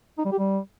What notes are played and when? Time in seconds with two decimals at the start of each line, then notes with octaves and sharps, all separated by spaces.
0.18 D#4
0.25 G3
0.32 G4
0.39 G3